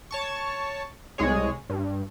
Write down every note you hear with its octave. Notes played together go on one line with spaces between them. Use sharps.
C#5 A5 C#6
C2 G#3 G#4 C#5
G2